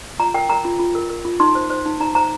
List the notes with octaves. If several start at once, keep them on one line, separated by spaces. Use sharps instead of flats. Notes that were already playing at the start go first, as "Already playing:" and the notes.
F4 A#5
A#4 G5
A#4 A#5
F4
F4
A#4
A#4
F4
D#4 C6
C5
C5
D#4
D#4 A#5
C5 A#5